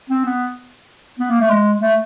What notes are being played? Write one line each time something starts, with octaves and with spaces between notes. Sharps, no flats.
C4
B3
B3
A#3
A3
G#3
A3